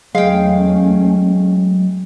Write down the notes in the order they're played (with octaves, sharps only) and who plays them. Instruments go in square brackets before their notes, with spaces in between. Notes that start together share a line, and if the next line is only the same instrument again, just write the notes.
[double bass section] E2 A3 C#4 [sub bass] F#3 [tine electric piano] G#3 [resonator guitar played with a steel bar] F5 G5